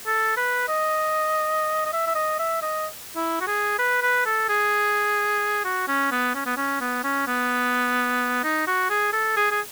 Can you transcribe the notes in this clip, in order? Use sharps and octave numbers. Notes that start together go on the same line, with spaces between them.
A4
B4
D#5
D#5
E5
E5
D#5
E5
D#5
E4
F#4
G#4
B4
B4
A4
G#4
F#4
C#4
B3
C#4
B3
C#4
B3
C#4
B3
D#4
F#4
G#4
A4
G#4
G#4